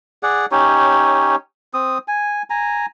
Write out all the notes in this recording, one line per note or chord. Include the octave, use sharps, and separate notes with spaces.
G#4 D5 F#5
C#4 D#4 G4 C#5
C4 D#6
G#5
G#5 A#5